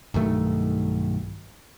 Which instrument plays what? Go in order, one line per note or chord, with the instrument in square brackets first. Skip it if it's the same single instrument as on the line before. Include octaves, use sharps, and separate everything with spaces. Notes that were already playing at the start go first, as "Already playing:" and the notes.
[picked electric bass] B1 G2 D#3 A3